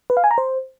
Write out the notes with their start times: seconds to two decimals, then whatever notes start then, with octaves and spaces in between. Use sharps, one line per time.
0.10 B4
0.17 F5
0.24 G#5
0.31 A#5
0.38 C5